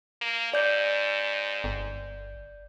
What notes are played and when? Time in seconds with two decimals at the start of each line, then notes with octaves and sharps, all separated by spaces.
0.22 A#3
0.53 G#2 D5 G6
1.64 G1